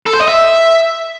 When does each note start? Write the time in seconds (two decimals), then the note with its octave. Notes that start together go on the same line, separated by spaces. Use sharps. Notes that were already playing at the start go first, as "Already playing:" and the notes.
0.07 A4
0.14 C5
0.21 D#5
0.28 E5